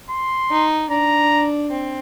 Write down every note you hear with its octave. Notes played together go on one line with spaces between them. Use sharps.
C6
D#4
D4 A#5
C4